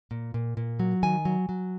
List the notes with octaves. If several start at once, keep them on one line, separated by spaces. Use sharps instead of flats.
A#2
A#2
A#2
F#3
D#3 G#5
F#3
F#3